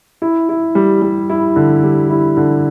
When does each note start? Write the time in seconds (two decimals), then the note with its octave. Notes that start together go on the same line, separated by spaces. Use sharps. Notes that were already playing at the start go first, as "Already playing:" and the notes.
0.22 E4
0.49 E4
0.75 G3
1.02 G3
1.30 E4
1.56 D3
1.83 G3
2.10 E4
2.37 D3